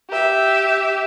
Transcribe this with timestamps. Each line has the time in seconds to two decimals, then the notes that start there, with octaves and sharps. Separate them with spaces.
0.10 G4 E5